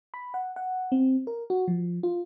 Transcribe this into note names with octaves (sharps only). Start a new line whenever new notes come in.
B5
F#5
F#5
C4
A#4
F#4
F3
F4